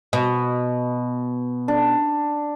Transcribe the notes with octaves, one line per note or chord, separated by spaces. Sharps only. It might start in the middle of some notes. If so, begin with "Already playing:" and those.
B2
D4